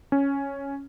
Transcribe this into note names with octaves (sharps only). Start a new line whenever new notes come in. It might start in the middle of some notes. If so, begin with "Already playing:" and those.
C#4